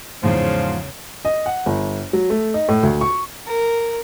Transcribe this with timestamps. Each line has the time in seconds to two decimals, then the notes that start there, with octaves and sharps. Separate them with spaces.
0.23 E2 G#2 C#3 F3
1.25 D#5
1.46 F#5
1.66 G1
2.13 F#3
2.30 A3
2.54 D#4
2.68 A2
2.83 D2
3.01 C#6
3.47 A#4